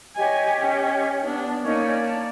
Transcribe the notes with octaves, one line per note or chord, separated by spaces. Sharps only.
G4 C#5 D#5 G#5
C#4
B3 D4
A#3 C#4 D#4 C#5 D5
A5